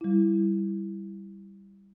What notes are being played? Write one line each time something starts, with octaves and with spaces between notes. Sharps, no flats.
G3 E4